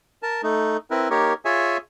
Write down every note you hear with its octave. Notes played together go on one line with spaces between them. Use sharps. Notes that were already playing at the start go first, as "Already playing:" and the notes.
A#4 A5
A3 D#4
C4 E4 A#4 B4
A#3 D#4 G4 A#4 C#5
F4 G#4 C#5 E5 G#5